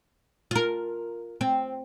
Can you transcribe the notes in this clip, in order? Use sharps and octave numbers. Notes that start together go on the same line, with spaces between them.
F4 A#4
C4